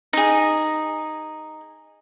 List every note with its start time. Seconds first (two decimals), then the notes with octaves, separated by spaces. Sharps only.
0.13 D#4 G#4